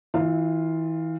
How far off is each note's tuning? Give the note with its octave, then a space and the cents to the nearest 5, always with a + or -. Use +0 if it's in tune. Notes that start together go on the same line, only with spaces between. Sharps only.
E3 -30 F4 +0 E5 -10